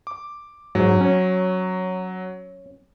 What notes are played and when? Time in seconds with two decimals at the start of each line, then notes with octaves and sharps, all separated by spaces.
0.07 D6
0.75 G#2 F#3
1.01 C#4